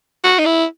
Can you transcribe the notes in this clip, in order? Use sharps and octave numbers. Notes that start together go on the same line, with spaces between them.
F#4
D#4
E4